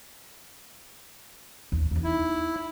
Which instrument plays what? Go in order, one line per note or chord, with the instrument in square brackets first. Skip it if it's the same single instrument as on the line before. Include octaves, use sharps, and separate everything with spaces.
[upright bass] D#2
E2 D#4
[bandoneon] E4